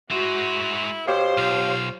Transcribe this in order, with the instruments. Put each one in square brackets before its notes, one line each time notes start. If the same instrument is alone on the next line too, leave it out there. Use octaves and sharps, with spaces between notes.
[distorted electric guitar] G#3 C5 [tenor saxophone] E4 [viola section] F#4
[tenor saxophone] B2 [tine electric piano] G4 C#5 F5 [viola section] C5
[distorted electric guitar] B1 [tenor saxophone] F4